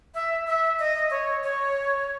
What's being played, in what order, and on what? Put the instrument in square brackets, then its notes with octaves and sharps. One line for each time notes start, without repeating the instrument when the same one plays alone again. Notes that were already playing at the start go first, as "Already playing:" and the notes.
[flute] E5
E5
D#5
C#5
C#5